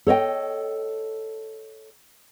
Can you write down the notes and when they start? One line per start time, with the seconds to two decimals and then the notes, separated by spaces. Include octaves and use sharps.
0.07 A4 C#5 D#5 G5